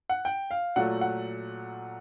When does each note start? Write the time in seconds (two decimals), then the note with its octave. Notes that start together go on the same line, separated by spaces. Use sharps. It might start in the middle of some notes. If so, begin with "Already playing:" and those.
0.10 F#5
0.25 G5
0.51 F5
0.76 A#2 F#3 A3 F#5
1.01 F#5